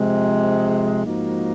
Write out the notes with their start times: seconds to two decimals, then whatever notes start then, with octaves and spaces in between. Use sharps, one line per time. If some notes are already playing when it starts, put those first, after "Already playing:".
Already playing: C3 F3 G#3
1.05 G#2 F3 A#3 D#4 F#4